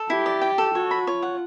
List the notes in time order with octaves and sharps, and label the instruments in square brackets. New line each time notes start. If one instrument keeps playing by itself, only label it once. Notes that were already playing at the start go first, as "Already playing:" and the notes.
Already playing: [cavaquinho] A4
[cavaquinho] E4 [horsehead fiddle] G4
[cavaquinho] D5
G5
A4
[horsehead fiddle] F#4 [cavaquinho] C#5
[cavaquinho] B5
[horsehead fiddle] F4 [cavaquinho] C#5
[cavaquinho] F#5